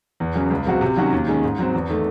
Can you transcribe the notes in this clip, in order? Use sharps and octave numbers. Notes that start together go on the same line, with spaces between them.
E2
C#3 F#3 C#4
C#2
C#3 F#3 C4 F#4
C3
D#3 F#3 C#4 F#4
D#2
D#3 G#3 C#4
G#2
F#3 C4
E2
D#3 A3